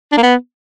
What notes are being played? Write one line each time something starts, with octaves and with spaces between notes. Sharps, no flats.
D4
A#3
B3